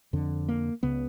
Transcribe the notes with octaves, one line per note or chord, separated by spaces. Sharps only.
F2 D3
A#3
C#2 C#3 B3